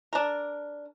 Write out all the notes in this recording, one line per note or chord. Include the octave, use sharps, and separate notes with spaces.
D4 A#4